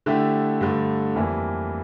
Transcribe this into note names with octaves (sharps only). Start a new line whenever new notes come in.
D3 A3 E4 G4
G2 D3 A3
F2 E3 G3 A#3 E4